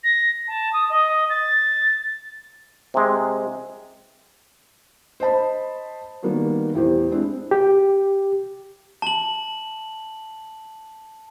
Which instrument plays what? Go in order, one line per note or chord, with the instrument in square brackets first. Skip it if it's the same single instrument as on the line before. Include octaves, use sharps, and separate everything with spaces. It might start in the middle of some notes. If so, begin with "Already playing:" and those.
[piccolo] A#6
A5
D#6
D#5
A6
[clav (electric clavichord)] C3 G#3
[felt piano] C5 D#5 A5 B5
D#3 G3 A#3 B3 F#4
E2 A2 G4 C5
G#3 C4 D4 E4
[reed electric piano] G4
[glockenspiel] A5 F#7